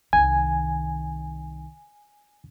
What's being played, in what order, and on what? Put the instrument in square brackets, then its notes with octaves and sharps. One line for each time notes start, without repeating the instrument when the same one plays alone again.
[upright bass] C2 D#3 [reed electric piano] G#5